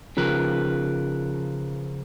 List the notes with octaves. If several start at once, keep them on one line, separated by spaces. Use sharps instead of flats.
C#3 F3 A#4 B4